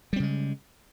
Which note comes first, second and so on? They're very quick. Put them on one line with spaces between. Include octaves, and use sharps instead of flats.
G3 C4 C#3 G#3